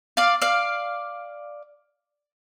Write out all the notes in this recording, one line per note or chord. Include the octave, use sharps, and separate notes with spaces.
D5 F5
D5 F5